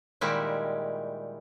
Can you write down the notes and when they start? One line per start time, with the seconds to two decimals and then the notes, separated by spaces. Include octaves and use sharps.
0.21 A#2 D#3 G3 G#3 E4